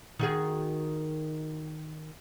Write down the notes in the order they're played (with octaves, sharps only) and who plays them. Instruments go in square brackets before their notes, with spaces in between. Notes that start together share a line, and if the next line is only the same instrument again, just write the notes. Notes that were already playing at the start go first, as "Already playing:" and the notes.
[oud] D#3 F#4 G#4